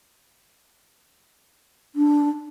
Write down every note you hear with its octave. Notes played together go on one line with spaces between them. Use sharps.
D4